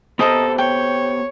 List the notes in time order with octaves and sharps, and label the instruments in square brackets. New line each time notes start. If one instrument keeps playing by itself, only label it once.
[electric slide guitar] B3 G4 C5 [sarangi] A4 [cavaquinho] A#4 D#5 D#6
[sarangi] C#5 [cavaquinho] G5